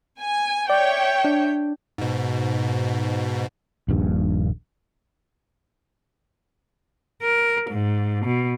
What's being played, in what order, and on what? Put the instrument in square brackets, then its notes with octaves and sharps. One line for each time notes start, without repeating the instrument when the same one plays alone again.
[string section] G#5
[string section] C#5 E5 G5 [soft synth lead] D5
[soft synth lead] D4
[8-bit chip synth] G#2 B2
[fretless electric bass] D#1 A#1 G2
[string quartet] A#4
G#2
B2